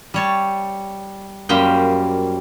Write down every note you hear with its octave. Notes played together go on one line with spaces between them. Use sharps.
G3 C#5 A5
F#2 G3 A#3 C5 G5